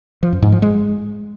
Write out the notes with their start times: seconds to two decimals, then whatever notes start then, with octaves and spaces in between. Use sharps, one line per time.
0.23 F3
0.33 F#2
0.42 G#2
0.52 F3
0.62 G#3